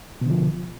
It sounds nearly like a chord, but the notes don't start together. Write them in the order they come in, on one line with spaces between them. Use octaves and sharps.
B2 D3 F3